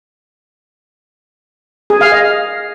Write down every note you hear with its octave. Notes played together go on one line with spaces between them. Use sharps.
G#4
F5
D#5